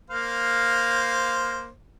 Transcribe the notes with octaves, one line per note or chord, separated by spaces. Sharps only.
A#3 C5 F5